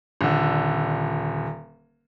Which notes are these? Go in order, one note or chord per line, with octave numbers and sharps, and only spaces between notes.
D#1 D3